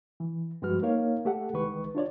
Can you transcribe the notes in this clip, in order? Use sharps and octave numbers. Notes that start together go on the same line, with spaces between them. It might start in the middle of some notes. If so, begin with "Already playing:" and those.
E3
G2 F3 G#3 F#4 B4 F6
A#3 D#4 A#4 C#5 F5
A3 G4 A4 F#5
C2 D#3 G#3 B4 C#6
D4 F4 C#5 D5